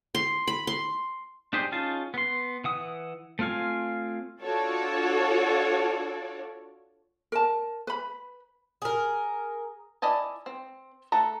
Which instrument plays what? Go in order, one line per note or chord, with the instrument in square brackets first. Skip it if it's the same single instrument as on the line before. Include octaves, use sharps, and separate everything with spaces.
[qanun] C6
B5
C6
[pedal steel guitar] D4 D#4 G4 G#4 C5
C#4 D#4 F4 G#4 A5
B3 C6
E3 F#5 D#6
A3 C4 F4 F5 G#5
[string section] D4 F4 F#4 A4 C#5 D5
[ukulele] A#4 A5
B4 B5
[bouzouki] G#4 A#4
[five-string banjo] E4 D5 D#5 G#5 A5
C4
A3 A4 F#5 A#5